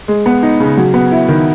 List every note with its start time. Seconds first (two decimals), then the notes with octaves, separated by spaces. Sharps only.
0.08 G#3
0.26 B3
0.43 D#4
0.60 C#3
0.77 F#3
0.94 B3
1.12 E4
1.28 D#3